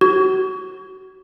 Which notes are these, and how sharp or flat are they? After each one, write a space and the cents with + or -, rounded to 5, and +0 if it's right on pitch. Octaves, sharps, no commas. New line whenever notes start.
F#4 +30